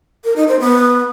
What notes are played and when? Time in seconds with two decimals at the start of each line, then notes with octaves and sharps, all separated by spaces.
0.24 A#4
0.36 D#4
0.48 C5
0.60 B3